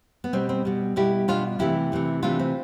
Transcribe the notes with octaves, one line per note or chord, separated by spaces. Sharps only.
B3
B2 G3 C4
C4
B2 G3
B2 G3 E4 G4
B2 G3 D4 F4
C3 E3 A3 E4 G4
C3 E3 A3
C3 E3 A3 D4 F4
C4